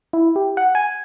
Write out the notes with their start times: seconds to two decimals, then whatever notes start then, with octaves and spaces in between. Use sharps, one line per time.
0.13 E4
0.36 G4
0.57 F#5
0.75 G#5